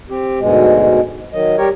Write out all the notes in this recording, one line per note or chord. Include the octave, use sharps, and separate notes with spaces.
C4 G4
D2 G#2 B2 G#3
D#3 F#3 D#5
G3 G4 A#4 C#5